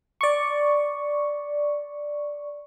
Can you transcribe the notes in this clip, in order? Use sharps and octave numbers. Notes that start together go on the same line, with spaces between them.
D5 C#6